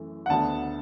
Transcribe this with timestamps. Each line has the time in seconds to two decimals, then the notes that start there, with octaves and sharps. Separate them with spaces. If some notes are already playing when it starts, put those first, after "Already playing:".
Already playing: F#2 E3 A3
0.26 F#5
0.29 D2 D3 B3 D4 A5